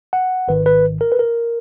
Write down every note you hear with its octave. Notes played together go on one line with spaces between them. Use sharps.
F#5
G#1 G#2 D#3 B4
B4
A#4
B4
A#4